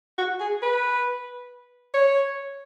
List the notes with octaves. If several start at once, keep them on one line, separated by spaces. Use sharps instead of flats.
F#4
G#4
B4
C#5